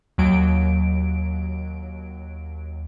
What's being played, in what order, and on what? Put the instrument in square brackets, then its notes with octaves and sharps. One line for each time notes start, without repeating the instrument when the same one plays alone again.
[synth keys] D#2 F#3 D7